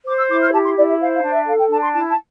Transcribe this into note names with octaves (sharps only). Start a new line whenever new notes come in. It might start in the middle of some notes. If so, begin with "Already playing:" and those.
C5 D6
E6
E4 D6
F6
G4 A5
C6
E4 D5
E5
C5 F5
F5
D4
E5
A4 F5
G5
D4 A5
C6
E4 A5
A5